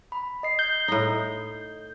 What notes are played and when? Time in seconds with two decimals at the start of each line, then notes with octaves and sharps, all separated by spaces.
0.12 B5
0.43 D#5 C7
0.59 G6
0.88 A2 D#4